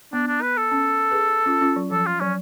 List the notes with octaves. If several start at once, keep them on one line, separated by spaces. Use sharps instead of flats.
B3 D4
D4
B4
A4
C#4
G#4 B4
C#4 F4
C#4 F4
F#3
F3 A4
F4
F#3 C#4